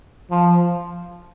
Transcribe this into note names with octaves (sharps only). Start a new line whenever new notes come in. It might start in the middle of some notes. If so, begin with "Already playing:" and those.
F3